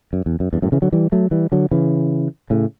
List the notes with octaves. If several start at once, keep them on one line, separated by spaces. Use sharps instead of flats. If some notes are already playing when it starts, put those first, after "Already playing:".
F#2
E2
F#2
E2 G2
F#2 A2
C#3 E3
D3 F#3
E3 G3
F#3 A3
E3 G3
D3 F#3
C#3 E3
A2 C#3